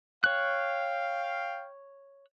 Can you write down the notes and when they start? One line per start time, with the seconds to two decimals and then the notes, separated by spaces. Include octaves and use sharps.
0.24 C#5 F5 G5 F#6